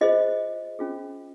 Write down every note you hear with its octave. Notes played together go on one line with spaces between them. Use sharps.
F4 G#4 C5 D#5
C#4 F4 G#4